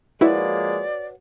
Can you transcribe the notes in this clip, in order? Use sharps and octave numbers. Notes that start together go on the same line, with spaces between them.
F3 G#3 A#3 E4 F#4 B4 C#5 D5